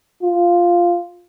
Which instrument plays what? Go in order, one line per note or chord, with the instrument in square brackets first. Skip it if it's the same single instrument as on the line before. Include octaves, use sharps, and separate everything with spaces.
[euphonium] F4